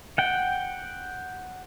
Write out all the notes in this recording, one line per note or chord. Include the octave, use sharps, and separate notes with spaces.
F#5 G5